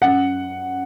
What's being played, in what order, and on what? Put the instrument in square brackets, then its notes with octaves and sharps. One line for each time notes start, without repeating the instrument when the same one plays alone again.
[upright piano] F#2 F#5